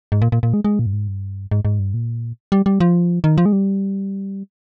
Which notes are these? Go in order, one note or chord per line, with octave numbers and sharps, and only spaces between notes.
G#2
A#2
A#2
A#2
G#3
G#3
A#2
G2
G#2
G2
G#2
G#2
G2
A#2
G3
G3
F3
D#3
F3
G#3
G3